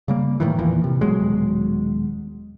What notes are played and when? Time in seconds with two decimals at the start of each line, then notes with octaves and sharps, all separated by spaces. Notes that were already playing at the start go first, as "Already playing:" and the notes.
0.08 C#3 G3 A#3
0.40 A2 D#3 E3
0.59 E2 A#2 E3 F3
0.84 C3
1.01 D#1 B2 F#3 G#3